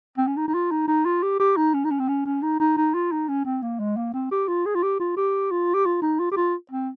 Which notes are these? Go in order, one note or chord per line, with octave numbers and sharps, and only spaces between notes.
C4
C#4
D#4
D#4
F4
D#4
D#4
F4
G4
G4
D#4
C#4
D#4
C#4
C4
C#4
C#4
D#4
D#4
D#4
F4
D#4
C#4
C4
A#3
G#3
A#3
C4
G4
F4
G#4
F4
G4
F4
G4
F4
G4
F4
D#4
F4
G4
F4
C4